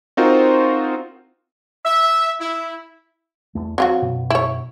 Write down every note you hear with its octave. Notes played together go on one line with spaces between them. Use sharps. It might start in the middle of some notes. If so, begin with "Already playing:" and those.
C4 D#4 F4 F#4 A#4 C5
E5
E4
E2 A3
F#3 C4 F4 F#4
F#2 B2
E4 C#5